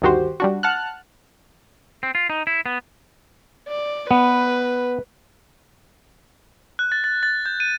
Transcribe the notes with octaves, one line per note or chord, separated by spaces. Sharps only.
D2 G2 D#3 F#4 G4 C5
G3 D4 F#4
F#5 A5 F6 F#6
C4
F4
D#4
E4
B3
D5
B3 B4
F#6
A6
A6
A6
G6
D#7